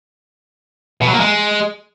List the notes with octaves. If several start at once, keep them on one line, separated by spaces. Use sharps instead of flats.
B2
F#3
A#3
G#3